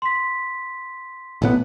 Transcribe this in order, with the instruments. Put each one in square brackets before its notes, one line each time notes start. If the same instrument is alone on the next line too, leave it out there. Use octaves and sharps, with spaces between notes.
[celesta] C6 B6
[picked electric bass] A1 A2 B3